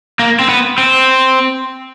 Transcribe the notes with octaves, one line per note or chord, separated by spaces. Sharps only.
A#3
C4
B3
C4